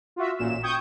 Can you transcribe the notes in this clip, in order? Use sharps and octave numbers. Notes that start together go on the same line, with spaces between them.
F4 F#4 E5
A1 A#2 E7
G5 C#6 D#6 G6 G#6